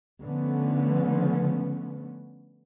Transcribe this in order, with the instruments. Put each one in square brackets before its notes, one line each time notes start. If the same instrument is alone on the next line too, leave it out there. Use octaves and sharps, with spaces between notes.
[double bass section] D3 F3 A3 B3 C#4